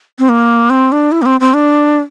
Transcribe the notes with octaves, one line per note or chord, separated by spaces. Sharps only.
C4
A#3
C4
D4
E4
A#3
C4
C4
D4